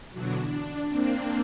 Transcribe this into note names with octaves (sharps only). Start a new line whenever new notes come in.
B2 D3 E3 F#3 D4 F#4
D4
A#3 C4 D4